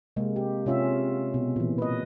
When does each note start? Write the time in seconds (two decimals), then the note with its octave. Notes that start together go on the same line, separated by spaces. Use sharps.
0.16 C3 G#3 A#3
0.36 G4
0.66 C3 C#4 F4 E5
1.34 B2
1.56 A#2 E3
1.78 B4 D#5